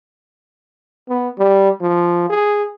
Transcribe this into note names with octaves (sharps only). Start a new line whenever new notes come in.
B3
G3
F3
G#4